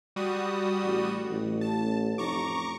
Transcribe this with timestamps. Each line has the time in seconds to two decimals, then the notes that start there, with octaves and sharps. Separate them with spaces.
0.16 G3 F#4 D#6
0.84 A1
1.29 A1
1.61 A5
2.18 F1 A#5 C#6 D6